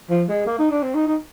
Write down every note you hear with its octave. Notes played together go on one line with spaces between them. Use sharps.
F3
G#3
A#3
D#4
D4
C4
D#4
D#4